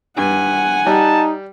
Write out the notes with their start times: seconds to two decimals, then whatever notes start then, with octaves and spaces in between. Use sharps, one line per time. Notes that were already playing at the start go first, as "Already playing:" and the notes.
0.18 G2 F#5 G#5
0.87 G3 D#4 A5